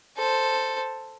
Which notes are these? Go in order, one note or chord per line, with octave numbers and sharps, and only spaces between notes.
A4 C5